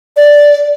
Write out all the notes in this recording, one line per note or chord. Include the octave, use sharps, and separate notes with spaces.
D5